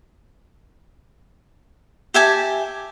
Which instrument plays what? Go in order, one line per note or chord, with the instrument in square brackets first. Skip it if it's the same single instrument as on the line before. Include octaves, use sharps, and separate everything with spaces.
[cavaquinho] G4 E5 G#5 A5